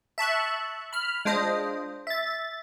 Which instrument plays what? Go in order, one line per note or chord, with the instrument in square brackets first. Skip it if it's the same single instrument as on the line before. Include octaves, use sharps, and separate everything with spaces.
[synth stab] E5 A5 C#6 F#6
B5 F6
G#3 D4 F4 C5 D#5
E5 A6